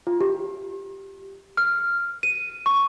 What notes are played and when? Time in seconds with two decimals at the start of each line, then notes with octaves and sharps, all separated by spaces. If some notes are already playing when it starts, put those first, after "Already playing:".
0.07 F4
0.21 G4
1.57 F6
2.23 D#7
2.66 C#6